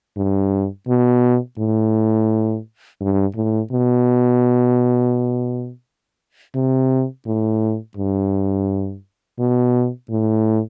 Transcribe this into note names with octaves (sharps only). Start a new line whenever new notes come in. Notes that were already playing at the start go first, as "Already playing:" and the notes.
G2
B2
A2
G2
A2
B2
C3
A2
G2
B2
A2